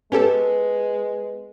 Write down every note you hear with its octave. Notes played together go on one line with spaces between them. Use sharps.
G#3 B3 C#4 G4 A4